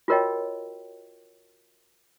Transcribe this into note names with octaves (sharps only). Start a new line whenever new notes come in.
F4 F#4 A#4 C#5 D#5 G5